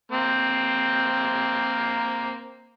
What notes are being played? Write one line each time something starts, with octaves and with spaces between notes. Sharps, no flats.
A#3 C4